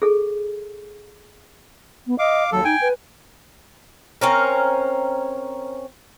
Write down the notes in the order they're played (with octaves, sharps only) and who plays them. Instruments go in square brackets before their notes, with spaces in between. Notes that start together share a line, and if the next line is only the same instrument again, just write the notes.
[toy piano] G#4 A4
[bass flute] B3
[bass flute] D#5 [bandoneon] F5 D6
[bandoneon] D#2 A4 [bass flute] F#3
[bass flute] D#4 [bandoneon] G5 G#5
[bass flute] B4
[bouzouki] C4 C#4 A#4